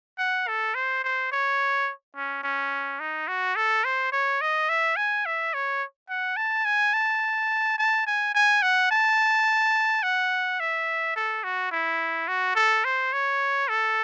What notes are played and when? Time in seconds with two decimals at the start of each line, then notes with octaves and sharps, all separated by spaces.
0.18 F#5
0.48 A4
0.75 C5
1.04 C5
1.32 C#5
2.16 C#4
2.43 C#4
3.00 D#4
3.28 F#4
3.56 A4
3.85 C5
4.12 C#5
4.41 D#5
4.69 E5
4.96 G#5
5.26 E5
5.54 C#5
6.09 F#5
6.37 A5
6.65 G#5
6.94 A5
7.78 A5
8.06 G#5
8.34 G#5
8.62 F#5
8.91 A5
10.03 F#5
10.60 E5
11.16 A4
11.44 F#4
11.71 E4
12.28 F#4
12.55 A4
12.85 C5
13.13 C#5
13.68 A4